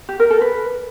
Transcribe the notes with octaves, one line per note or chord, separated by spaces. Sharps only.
G4
A#4
A4
B4